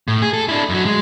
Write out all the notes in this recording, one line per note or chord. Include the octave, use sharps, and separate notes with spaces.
A2
G#4
A4
D4 E4
F#2 F#3
G#3